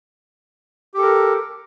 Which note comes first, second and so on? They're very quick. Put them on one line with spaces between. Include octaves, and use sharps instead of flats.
G4 A4 A#4